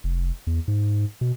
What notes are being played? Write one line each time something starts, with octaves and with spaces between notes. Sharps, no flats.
F1
E2
G#2
B2